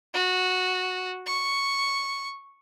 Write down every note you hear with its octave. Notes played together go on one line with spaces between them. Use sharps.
F#4
C#6